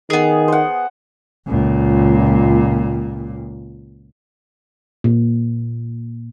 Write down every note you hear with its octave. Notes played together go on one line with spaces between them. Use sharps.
D#3 B3 G#4
C5 F#5
C#2 A#2
A#2